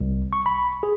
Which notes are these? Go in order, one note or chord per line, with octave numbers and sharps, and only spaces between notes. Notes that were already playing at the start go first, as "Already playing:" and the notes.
C2
C#6
B5
G#4